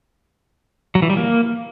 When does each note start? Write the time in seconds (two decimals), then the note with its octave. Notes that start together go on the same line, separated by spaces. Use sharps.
0.95 F#3
1.02 E3
1.10 G3
1.17 A#3